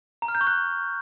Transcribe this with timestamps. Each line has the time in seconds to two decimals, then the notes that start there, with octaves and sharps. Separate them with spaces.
0.22 A#5
0.28 F6
0.35 G6
0.41 C#6
0.47 F#6